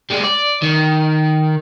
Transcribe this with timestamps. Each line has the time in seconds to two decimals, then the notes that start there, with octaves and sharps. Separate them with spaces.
0.10 G3 G#3
0.23 D5
0.62 D#3